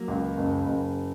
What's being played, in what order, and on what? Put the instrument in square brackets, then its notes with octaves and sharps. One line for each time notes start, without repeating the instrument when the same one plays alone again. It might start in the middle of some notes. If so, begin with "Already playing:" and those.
Already playing: [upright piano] F#3 [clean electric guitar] A#3
[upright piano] C#2
F#1
F#1